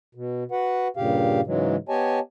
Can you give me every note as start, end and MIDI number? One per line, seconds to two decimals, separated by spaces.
0.15 0.44 47
0.51 0.88 66
0.51 0.88 71
0.51 0.88 78
0.97 1.41 43
0.97 1.41 46
0.97 1.41 49
0.97 1.41 67
0.97 1.41 77
1.46 1.76 44
1.46 1.76 49
1.46 1.76 52
1.46 1.76 54
1.46 1.76 56
1.89 2.19 59
1.89 2.19 67
1.89 2.19 73
1.89 2.19 75
1.89 2.19 80
1.89 2.19 81